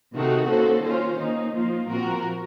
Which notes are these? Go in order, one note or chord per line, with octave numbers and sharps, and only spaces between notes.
C3 D#3 A3 C4 F#4
A#3 C#4 F#4 A4 C5
D#3 A#3 C#4 F4 C5
D#3 A#3 D#4
F3 A#3 F4
A#2 F3 C4 F#4 A#4